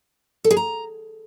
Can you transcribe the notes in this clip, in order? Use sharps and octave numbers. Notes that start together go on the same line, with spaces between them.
A4
G#4
A#5